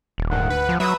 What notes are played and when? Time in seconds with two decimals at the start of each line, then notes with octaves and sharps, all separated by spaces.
0.18 D#1
0.31 G#2 D3 D#3 F#5
0.49 D2 B4
0.69 F3
0.80 F#3 B4 E5 D#6